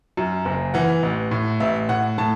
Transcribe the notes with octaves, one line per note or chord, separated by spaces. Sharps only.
F#2
F#1
E3 F#5
A1
A2
A1 E5
A2 F#5
A2 A5